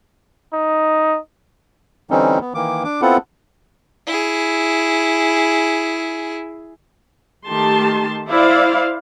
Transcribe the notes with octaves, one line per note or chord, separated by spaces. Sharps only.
D#4
D3 E3 G3 C4 C#4 D#4
B3
D#3 E3 A#3 D6
D4 D6
B3 C4 E4 F4 A4 F#5
E4 G#4
D#3 A3 G4 A5 C6
E4 C5 D5 F5